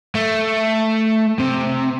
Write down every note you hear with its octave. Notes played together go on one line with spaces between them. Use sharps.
A3
C3